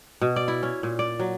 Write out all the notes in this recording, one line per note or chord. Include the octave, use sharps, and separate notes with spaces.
B2
D5
E4
C#4
A#2
D5
F#3